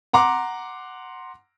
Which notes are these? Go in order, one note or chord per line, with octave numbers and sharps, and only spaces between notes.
F#5 A#5 C6 D6